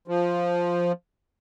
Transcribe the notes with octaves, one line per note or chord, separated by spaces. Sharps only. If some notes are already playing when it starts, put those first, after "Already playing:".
F3